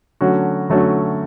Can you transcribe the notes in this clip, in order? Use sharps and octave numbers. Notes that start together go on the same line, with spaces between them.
D3 F#3 A3 C#4 F#4
D3 F#3 A3 C#4 F#4